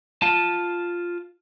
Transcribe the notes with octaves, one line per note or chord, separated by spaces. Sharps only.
F4 A5